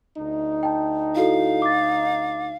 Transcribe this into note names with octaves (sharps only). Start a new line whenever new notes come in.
D2 D#4
G5 A5
E4 F#4 A4 F5
D6 A6